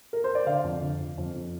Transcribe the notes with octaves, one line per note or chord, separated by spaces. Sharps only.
A#4
C5
D5
D3 F5
F2
D3
F2
F2
F2